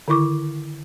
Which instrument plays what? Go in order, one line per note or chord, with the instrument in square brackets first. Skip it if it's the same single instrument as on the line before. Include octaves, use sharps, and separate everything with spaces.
[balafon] D3 D#3 E4 C#6 D6